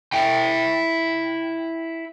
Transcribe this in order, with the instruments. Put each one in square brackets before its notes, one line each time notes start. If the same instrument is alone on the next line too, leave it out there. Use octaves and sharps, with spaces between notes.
[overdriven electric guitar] E4 G5